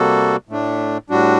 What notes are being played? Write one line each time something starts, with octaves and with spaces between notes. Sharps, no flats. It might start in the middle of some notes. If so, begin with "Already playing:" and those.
Already playing: C3 G3 A#3 F#4 A4
A2 A3 D4
A2 G3 D4 F#4